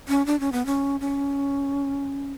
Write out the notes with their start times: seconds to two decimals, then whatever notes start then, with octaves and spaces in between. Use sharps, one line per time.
0.08 C#4
0.26 D4
0.40 C#4
0.52 B3
0.66 C#4
1.00 C#4